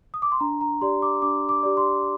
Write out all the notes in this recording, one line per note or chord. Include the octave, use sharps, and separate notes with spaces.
D#6
D6
C6
D4 A#5
A#5
G4 D5 C6
D6
D4 D6
D6
G4 D5
C6